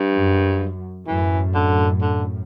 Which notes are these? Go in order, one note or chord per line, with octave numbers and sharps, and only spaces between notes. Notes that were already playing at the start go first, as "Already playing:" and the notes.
Already playing: G2
F#2
F#2 A2 E3
D3
D3